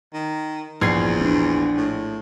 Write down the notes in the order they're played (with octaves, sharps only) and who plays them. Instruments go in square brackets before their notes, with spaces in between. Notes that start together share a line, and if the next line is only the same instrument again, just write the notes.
[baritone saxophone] D#3
[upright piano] A#1 G#6 C7 [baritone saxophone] E2
[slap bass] C4 D4
[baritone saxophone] A2